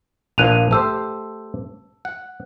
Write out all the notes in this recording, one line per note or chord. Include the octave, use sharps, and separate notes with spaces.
A#1 A#2 F3 F#6 D#7 F7
A3 G4 C5 A5 E6
F#5